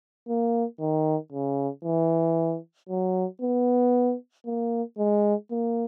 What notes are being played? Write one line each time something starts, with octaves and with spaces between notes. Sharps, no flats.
A#3
D#3
C#3
E3
F#3
B3
A#3
G#3
A#3